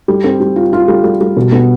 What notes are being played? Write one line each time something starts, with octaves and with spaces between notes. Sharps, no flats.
G3
C4
G3
F4
F4
G3
G3
G3
B2
B3